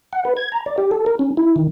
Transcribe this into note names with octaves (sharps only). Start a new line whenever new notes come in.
F#5
B4
G#6
A#5
D5
G4
A4
A#4
C#4
E4
D#3